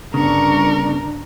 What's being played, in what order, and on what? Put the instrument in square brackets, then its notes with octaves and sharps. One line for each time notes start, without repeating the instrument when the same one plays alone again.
[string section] G1 C#6 [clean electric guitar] C#3 B3 [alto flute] D4 [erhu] A#4